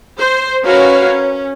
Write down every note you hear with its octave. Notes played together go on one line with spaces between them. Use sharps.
C5
C#4 F#4 A#4 B4 C#5 F5
C#4